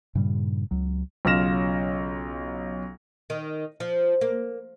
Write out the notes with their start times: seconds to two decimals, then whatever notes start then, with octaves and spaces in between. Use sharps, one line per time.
0.15 G2 A#2 C#3 G3
0.71 C#2 F#3
1.25 B1 C#3 F4 F6 A#6 E7
3.30 D#3
3.80 F3
4.21 A#3